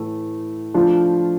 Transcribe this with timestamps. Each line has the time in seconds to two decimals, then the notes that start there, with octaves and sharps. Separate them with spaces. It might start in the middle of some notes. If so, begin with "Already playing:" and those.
Already playing: A2 E3 A3
0.74 F3 A3 D4 F4